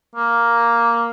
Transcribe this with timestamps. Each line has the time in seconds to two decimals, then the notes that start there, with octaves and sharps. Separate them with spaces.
0.16 A#3